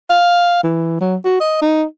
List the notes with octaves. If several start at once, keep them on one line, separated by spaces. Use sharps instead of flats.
F5
E3
F#3
F#4
D#5
D#4